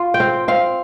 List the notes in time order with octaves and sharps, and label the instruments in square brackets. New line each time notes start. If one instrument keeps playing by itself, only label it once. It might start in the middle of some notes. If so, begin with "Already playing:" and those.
Already playing: [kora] F4
G5
C4 F5
C4 F5